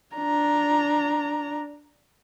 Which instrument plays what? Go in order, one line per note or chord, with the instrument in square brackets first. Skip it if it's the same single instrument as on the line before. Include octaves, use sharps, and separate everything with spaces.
[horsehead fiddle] D4 A#5